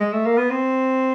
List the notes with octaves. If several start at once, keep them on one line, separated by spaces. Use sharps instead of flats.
G#3
A3
A#3
B3
C4